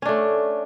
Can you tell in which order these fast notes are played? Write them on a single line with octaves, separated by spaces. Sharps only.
C#4 D4 A3